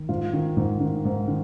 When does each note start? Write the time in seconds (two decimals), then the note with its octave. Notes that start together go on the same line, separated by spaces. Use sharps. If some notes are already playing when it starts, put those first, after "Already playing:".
Already playing: D#3
0.09 G#2 F4
0.33 D#3
0.57 G#2
0.81 D#3
1.05 G#2
1.28 D#3